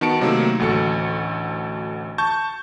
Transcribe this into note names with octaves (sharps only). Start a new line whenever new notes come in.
D#3 B3 F#4 A5 C#7 D7
C3 D#3 F#3 A3 A#3 C4
A1 D2 F#4 A4 A6 C#7
A5 C#6 G6